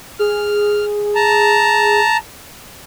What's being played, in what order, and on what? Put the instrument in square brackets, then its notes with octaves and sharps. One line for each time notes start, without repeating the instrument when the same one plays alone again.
[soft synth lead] G#4 [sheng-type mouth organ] F6
[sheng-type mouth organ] A5 A#5